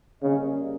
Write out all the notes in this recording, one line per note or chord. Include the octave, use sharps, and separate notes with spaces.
C#3 G3 A#3 C#4 G#4 D#5